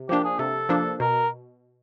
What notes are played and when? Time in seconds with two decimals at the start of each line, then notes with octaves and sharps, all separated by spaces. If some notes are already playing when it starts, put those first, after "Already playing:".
Already playing: C3
0.09 F3 A#3 D4 G4
0.24 G#4
0.39 C3 A4
0.69 F3 A#3 D4
1.00 B2 A#4